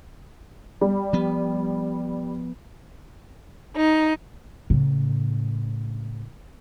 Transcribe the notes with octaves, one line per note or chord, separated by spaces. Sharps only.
G3
F3 B3
D#4
A2 C#3